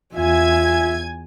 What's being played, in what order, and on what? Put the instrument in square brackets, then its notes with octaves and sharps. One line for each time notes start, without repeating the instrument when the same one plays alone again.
[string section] E2 G#5 G#6 [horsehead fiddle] F4 E5